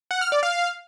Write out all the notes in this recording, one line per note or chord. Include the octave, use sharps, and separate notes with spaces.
F#5
F6
D5
F5